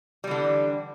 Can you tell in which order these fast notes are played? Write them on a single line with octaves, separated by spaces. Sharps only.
G3 E3 D3